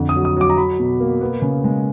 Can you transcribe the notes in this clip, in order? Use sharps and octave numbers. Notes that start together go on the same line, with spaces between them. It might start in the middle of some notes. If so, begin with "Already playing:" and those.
Already playing: F2 D3
D#6
F#3
D#6
F#3 D6
A#5
F#3 B5
B2
A#3
B3
C#3
G#3